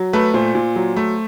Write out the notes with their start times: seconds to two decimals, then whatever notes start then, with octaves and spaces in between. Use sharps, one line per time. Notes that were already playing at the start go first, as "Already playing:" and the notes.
Already playing: F#3
0.13 A3 B4
0.34 A#2 C5
0.55 A#2
0.76 F#3
0.96 A3